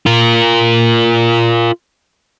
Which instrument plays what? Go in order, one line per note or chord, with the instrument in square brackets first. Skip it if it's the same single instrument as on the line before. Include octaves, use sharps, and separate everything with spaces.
[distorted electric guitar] F4 A#4